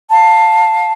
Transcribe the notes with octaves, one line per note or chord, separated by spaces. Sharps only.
F5 A5